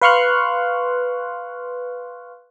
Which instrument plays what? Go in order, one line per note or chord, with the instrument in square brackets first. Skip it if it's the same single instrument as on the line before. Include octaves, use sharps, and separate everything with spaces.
[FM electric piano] B4 F5 C6 C#6 F6 F#6